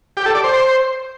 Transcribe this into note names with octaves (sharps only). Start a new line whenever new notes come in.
G4
A4
D5
C5